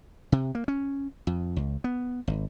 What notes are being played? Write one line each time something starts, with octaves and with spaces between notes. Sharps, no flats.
C3
A#3
C#4
F2
C#2
B3
G#1